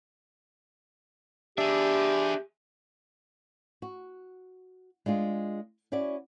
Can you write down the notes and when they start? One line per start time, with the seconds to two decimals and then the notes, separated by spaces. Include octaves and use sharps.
1.58 D4 G4 G#4 E5
3.82 F#4
5.06 G#3 D4 F4 G#4
5.92 C#4 E4 F#4 D5